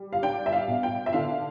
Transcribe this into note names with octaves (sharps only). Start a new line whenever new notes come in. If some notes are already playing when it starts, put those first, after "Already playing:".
Already playing: G3
F5
D4 G5
E5
F5
B2
G5
E5
D3 F5